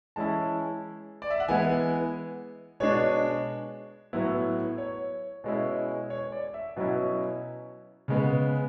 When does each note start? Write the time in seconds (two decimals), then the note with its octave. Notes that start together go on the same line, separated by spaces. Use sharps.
0.16 E3 G#3 C#4 E4 A5
1.22 D5
1.30 E5
1.40 F#5
1.48 E3 G#3 B3 E4 G#5
2.80 B2 G#3 D4 C#5
4.13 A2 F#3 B3 E4
4.78 C#5
5.44 B2 G#3 C#4 E4
6.10 C#5
6.32 D5
6.54 E5
6.76 B2 F#3 C#4 E4
8.08 C#3 G#3 B3